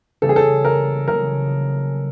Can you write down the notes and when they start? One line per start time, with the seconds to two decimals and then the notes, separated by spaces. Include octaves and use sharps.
0.22 C#3 E3 G3 A#3 A4
0.29 G#4
0.36 A4
0.65 A#4
1.07 C#3 F#3 A#3 A#4